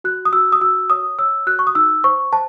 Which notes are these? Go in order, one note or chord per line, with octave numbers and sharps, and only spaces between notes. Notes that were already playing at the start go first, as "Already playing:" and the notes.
F#4 F#6
D#6
F#4 E6
D#6
F#4 E6
C#5 D#6
C#5 E6
F#4 F#6
C#6
D#6
D#4 E6
C5 C#6
C5 A5